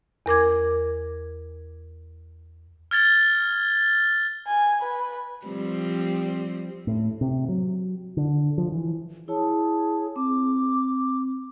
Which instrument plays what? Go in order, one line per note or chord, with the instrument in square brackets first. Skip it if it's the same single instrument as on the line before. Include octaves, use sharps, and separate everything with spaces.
[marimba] E2 A#4 D6 G#6
[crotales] F6 G#6 A6 G7
[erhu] G#5
B4
[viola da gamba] F3 G3 C4
[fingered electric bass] A2
C3
F#3
D3
F3
E3
[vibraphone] E4 C#5 A5 [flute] G#4
[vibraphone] C4 [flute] D6